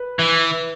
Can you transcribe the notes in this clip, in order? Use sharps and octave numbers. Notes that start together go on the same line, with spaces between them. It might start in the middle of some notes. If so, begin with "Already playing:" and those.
Already playing: B4
E3